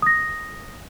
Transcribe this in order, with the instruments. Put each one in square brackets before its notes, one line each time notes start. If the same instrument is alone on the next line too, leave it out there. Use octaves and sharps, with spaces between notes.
[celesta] D#6 A#6